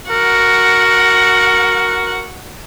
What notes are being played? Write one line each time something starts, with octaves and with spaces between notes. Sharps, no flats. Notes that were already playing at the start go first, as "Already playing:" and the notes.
F#4 A#4 F#5